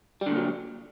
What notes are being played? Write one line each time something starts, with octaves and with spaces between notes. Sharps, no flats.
A#2 D3 F#3 G3